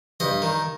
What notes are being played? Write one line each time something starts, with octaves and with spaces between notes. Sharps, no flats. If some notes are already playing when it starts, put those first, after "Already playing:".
G2 D#5
D#3